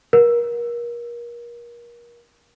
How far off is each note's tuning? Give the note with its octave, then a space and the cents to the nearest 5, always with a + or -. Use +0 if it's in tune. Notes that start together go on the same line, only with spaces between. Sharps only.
A#4 +30